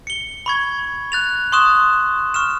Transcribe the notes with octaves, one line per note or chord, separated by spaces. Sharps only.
C#7 G7
B5 C#6 G#6
F#6 A6 F7
C6 C#6 D#6 F#6 E7
C#6 F6 E7